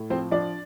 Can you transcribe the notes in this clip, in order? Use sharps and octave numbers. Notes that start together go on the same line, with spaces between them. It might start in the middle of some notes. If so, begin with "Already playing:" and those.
Already playing: A2
F3 C4 C5
F3 D4 D5